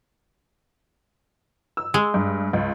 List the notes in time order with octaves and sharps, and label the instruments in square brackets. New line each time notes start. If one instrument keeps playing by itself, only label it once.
[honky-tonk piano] E6
[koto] G#3
[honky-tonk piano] G2
C#2